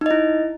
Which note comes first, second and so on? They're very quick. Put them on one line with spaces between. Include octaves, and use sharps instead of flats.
D#4 D#5 E4